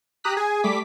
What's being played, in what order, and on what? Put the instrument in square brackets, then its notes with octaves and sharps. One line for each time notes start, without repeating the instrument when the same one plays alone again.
[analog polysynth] G4 A#5 D#6 F#6 B6
G#4 G#5
G3 A3 D6 B6